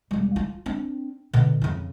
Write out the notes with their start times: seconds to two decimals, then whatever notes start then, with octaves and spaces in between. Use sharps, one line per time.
0.11 E1 G3
0.36 F4
0.66 C4 D4
1.33 B2 D3
1.62 F2 C#3